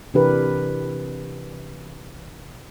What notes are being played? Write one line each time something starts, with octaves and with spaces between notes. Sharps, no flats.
C3 E3 D4 G4 A#4 B4